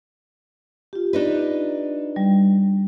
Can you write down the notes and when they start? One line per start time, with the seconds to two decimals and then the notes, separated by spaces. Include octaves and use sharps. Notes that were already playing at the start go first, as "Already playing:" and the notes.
0.93 F4 G4
1.13 D4 D#4 B4
2.16 G3